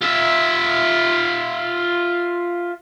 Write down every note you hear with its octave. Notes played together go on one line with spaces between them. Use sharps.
F4 E5